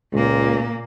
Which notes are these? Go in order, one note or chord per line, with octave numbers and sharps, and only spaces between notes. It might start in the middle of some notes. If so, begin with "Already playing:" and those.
C#2 A#2 A#3